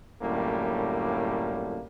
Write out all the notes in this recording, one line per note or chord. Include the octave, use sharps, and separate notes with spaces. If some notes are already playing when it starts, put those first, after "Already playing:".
F#2 A2 D3 G3 A#3